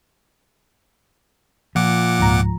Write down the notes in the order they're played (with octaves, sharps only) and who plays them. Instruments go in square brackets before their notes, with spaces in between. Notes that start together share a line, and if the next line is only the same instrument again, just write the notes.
[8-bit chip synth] A#2 F#5 D6 [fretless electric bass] F3
[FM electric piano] C#2 G#2 A#5